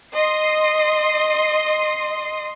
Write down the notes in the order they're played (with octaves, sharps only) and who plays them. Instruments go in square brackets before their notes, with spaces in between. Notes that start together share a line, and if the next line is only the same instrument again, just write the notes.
[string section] D#5 C6 D#6 C7